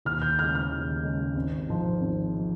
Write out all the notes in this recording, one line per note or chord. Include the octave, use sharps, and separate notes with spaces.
D#2 F6
G6
C#3 G#3 F6
F6
D#2
C#3 G#3
G#1
G#2 F3
G#1
F3